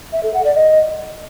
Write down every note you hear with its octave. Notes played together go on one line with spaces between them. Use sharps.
E5
A4
F#5
D5
D#5